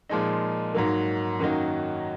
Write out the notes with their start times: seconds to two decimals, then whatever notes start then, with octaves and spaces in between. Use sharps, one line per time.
0.09 A#2 F3 G#3 D#4
0.74 G#2 F#3 A#3
1.39 F#2 D#3 F#3 A#3 D#4